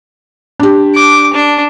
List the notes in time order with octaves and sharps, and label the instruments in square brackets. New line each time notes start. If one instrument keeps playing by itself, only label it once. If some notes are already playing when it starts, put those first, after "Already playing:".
[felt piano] D4 G4
[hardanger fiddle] D6
D4